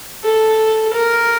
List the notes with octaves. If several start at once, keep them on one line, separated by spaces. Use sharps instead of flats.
A4
A#4